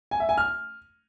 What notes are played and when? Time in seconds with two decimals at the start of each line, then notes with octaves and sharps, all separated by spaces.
0.11 G#5
0.20 E5
0.29 G#5
0.38 F6